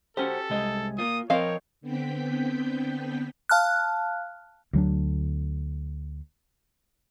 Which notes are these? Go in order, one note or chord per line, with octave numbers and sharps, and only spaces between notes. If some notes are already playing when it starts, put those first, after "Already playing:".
C#4 F#4 G4 A4 C5
C2 G#3 D#5
A#3 F4 D#6
F3 C4 A#4 C#5 D#5 F5
D3 B3 C4 G5 G6 B6
F5 A5 F6 F#6
D2 F#3 D4